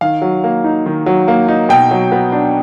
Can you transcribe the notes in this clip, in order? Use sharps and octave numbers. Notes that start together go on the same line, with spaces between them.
D#3 F5
F#3
A#3
D#4
D#3
F#3
A#3
D#4
B2 G5
F#3
B3
D4